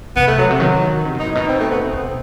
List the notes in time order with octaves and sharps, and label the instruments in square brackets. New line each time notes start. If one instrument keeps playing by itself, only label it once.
[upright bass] C3 [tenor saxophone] B3
[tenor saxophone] A3
[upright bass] B2 [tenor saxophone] F#3
[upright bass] C3
[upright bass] D#3 [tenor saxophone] F#3
[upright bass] C3
[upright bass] B2 [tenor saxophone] D#4
[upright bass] A2
[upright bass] B2 [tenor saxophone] D#4
[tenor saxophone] C4
A3
B3
C4
[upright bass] B2